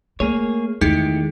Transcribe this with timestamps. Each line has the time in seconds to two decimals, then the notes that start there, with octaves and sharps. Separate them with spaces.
0.20 A3 A#3 G#4 C#5
0.81 E2 D#3 G#3 A3 D#4 E4 G4